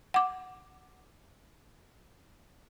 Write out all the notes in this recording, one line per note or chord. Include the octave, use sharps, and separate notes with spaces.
F#5 D6